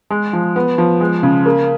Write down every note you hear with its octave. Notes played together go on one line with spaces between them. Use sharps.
G#3
F3
B3
F3
G#3
C#3
A#3